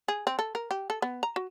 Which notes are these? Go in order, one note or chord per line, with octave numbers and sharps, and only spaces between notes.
G#4
C4
A4
A#4
G4
A4
B3
A#5
F#4